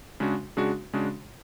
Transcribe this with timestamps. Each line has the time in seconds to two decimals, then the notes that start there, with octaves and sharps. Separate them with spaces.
0.20 C#3 G#3 D4 F#4
0.57 C#3 G#3 D4 F#4
0.93 C#3 G#3 D4 F#4